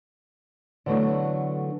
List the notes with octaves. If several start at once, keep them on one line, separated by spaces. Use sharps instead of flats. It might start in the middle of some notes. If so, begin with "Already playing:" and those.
D3 E3 F#3 A3 B3 D4